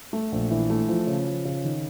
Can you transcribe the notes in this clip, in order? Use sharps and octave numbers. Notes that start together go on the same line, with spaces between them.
A3
A#1
E3
A3
F3
C#3
F3
C#3
D#3